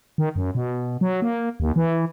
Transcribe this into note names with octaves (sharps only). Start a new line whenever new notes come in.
D#3
F#2
B2
F#3
A#3
D#2
E3